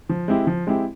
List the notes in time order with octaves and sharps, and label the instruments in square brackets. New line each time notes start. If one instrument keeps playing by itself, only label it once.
[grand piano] F3
G#3 C4 E4 G4
F3
G#3 C4 E4 G4